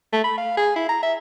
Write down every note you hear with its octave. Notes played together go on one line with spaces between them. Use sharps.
A3
B5
F5
G#4
E4
A#5
E5